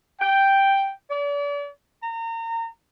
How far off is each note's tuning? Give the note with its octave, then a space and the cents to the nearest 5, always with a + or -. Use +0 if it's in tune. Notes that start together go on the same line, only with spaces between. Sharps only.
G5 +0
D5 -40
A#5 -30